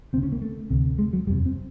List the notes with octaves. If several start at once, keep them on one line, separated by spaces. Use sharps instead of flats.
D2 C#3 C4
C#4
A#3
A3
D2 C3
G#3
F#3
F#1 E2 C3 G3
C4